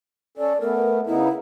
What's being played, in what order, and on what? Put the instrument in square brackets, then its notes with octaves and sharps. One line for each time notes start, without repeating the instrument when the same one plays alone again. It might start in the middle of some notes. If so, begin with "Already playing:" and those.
[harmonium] C#4 A4 [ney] D5
[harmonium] A3 B3 [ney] A#4
[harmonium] C#3 B3 D#4 [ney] E4